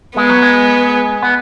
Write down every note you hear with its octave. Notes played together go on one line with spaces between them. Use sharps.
G#3 B3
F#3
G#3
B3